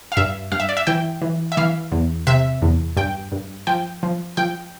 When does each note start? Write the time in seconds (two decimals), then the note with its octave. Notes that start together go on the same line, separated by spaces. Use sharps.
0.12 F5
0.17 G2 E5
0.52 G2 F5
0.60 E5
0.69 D5
0.77 E5
0.87 E3 G5
1.22 E3
1.52 E5
1.57 E3 F5
1.92 E2
2.27 C3 E5
2.62 E2
2.97 G2 G5
3.32 G2
3.67 F3 G5
4.03 F3
4.37 F3 G5